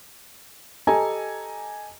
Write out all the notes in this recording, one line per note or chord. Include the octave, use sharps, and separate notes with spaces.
G4 A4 D#5 G#5 A#5